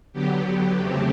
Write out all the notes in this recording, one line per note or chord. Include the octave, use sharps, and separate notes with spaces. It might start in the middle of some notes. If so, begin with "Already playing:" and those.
D3 F#3 B3 G4
E2 C#3 F#3 A3 C4 G4